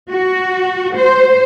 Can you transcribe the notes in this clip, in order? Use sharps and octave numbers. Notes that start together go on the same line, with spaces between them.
F#4
C5